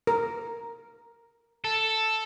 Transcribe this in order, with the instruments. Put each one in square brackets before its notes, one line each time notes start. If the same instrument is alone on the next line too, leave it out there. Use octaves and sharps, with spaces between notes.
[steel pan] A#4
[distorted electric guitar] A4